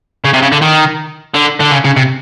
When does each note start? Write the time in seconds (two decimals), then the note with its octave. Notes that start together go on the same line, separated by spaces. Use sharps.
0.25 C#3
0.34 C3
0.42 C#3
0.52 D3
0.62 D#3
1.35 D3
1.60 D3
1.72 C#3
1.85 C#3
1.97 C3